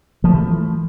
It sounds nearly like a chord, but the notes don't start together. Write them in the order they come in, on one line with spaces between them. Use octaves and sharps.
F3 A3 E3